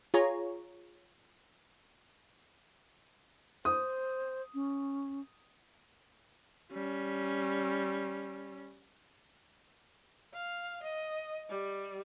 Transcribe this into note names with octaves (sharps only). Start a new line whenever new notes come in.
F4 G#4 C#5 A#5
C5 D#6
C#4
G3 C#4
F5
D#5
G3